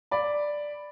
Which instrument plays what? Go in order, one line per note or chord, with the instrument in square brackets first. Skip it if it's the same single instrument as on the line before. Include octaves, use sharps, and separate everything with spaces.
[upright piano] D5 B5